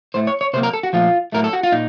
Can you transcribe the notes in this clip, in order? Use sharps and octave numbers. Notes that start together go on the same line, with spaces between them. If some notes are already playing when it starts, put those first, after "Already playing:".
A2 A3 C5
C#5
C#5
C3 F#3 A#3 C5
A#4
A4
F#4
A#2 F3 A3 F4
A2 F#3 A3 A#4
A4
F#4
F4
A#2 D#4